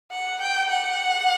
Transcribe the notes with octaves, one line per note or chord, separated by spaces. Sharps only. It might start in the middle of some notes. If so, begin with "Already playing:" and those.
F#5
G5
F#5